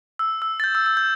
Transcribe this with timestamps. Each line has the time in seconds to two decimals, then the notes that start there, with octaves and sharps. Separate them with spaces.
0.19 E6
0.42 E6
0.60 A6
0.64 G6
0.75 E6
0.86 E6
0.97 G6